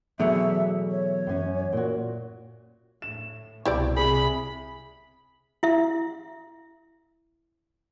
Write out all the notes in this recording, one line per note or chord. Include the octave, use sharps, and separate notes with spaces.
E2 B2 F#3 A3 G#4 E5
C#5
F#2 C#4
A#2 F#4
A2 E7
C2 B2 E4 C5 D5
C3 G#4 B5
E4 E5